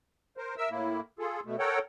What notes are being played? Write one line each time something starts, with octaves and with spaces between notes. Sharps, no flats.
A#4 C5
A#4 E5 E6
A2 A#3 E4
F4 G#4 A4
B2 A3
A4 A#4 C#5 F#5 G5